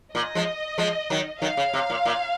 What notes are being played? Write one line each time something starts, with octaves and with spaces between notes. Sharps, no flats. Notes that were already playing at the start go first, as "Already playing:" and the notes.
A#2 D#5
F3 G#3
F3 G#3
D#3 F#3
D#3 F#3 F5
C#3
C3
A#2
A#2